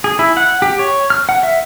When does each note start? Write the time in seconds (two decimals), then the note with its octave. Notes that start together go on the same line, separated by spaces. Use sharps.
0.04 G#4
0.19 E4
0.37 F#5
0.62 G4
0.79 C#5
1.10 F6
1.29 F#5
1.43 E5